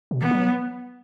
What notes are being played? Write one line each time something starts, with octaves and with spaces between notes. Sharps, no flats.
B2
E3 B3
F#3